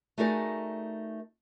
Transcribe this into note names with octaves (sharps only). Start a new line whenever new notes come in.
A3 D#4 F#4 G#4 A#4 D5